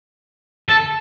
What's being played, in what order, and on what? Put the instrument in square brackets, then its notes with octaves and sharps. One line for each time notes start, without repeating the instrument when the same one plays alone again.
[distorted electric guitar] A4